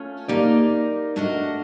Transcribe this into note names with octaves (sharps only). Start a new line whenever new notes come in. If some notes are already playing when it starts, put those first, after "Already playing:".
Already playing: A3 C#4 F4 A4
A#3 D#4 G4 A#4 D5
A3 D4 F#4 A#4 D#5